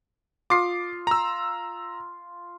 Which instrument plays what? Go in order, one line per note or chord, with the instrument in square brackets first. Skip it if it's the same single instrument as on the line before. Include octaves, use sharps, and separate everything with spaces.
[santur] F4 D#6 [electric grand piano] D6 C7
[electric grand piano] A#5 E6